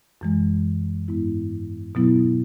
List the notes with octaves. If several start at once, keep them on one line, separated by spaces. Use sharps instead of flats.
F#2 E3 G#3
G#2 G#3 B3 E4
B2 F#3 B3 E4